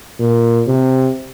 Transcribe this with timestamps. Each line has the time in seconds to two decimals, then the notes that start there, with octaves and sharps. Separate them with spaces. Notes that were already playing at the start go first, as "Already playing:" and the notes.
0.20 A#2
0.67 C3